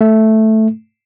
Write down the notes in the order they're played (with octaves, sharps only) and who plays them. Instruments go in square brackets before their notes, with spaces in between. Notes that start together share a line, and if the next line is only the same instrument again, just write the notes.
[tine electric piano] A3